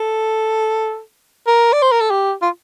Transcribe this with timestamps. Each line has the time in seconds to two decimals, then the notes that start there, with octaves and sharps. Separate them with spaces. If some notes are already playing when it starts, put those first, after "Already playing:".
Already playing: A4
1.47 A#4
1.73 D5
1.82 C5
1.92 A#4
2.01 A4
2.11 G4
2.42 F4